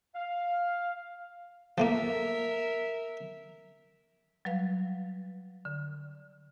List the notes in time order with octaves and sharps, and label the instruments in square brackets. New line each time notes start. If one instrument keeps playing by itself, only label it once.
[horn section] F5
[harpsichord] F3 A3 A#3 [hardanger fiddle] A#4 E5
[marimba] F#3 G3 B4 F5
D3